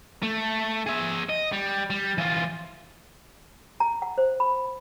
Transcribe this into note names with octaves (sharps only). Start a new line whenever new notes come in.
A3
G#4 E5
D#5
G3
G3
E3 F4
A#5
F#5
C5
B5